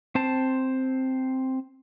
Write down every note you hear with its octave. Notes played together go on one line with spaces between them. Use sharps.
C4 C5 A5